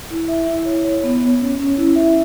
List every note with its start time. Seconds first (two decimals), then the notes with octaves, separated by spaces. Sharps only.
0.11 E4
0.28 E5
0.48 E4
0.65 C#5
0.85 C#5
1.04 B3
1.21 C#5
1.41 C#4
1.60 C#4
1.78 E4
1.96 E5